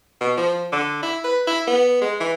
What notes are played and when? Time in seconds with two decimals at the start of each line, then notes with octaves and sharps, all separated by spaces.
0.21 B2
0.37 F3
0.72 D3
1.03 E4
1.24 B4
1.47 E4
1.67 B3
2.01 G#3
2.20 E3